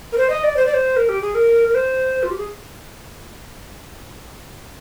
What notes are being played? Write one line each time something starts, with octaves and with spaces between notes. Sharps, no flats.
A#4
C5
D#5
D5
C5
D5
C5
A#4
G4
G#4
A#4
A#4
C5
F4
G4
G#4